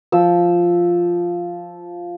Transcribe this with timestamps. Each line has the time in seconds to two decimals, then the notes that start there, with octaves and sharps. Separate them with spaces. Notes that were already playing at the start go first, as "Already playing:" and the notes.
0.12 F3 E6